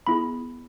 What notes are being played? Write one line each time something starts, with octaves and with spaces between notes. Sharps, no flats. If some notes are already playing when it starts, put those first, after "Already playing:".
B3 E4 G#4 B5